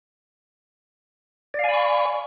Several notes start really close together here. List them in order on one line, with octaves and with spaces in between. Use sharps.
D5 F5 G#5 B5 C#6